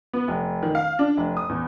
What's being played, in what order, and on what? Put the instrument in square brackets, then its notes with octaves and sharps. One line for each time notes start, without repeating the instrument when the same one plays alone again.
[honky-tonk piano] B3
F1
D#3
F5
D4
F1
D#6
E2